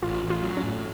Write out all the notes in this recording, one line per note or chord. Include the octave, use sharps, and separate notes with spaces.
A1 F4
A1
F4
F#3
C#4
A2